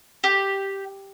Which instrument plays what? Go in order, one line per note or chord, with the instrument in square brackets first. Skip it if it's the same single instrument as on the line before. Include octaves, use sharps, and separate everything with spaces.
[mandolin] G4